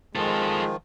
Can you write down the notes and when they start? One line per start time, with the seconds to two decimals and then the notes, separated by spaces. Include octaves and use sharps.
0.15 D#3 F3 G#3 F4 A4